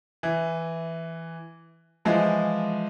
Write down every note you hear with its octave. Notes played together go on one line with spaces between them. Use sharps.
E3
E3 F3 G#3